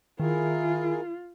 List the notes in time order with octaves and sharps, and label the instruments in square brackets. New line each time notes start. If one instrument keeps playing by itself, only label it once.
[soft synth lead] D#3 [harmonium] E4 G#4 A#4 [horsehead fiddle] F4